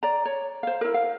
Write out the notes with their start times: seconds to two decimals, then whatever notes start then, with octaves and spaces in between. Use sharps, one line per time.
0.03 D5 A#5
0.25 C#5
0.63 C5 F5
0.81 E4 A#4
0.94 F5